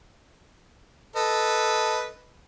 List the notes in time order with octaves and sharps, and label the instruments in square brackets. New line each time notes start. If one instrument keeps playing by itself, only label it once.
[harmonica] A4 B4 D#5